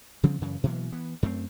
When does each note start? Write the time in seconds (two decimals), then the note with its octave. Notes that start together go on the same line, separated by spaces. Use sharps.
0.23 C#3 F3 G3 C4
0.41 F#2 C#3 E3
0.63 B2 E3 F#3 A#3
0.92 E3 B3
1.23 F#2 A3 A#3 C4